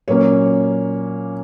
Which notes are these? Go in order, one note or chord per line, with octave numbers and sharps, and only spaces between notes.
A#2 F#3 A#3 C#4 C#5